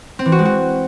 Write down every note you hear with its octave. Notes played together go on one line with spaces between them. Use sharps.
C4
E3
F#4
G#3
F#4